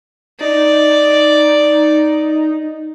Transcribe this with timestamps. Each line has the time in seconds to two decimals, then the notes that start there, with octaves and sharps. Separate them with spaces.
0.41 D#4 D5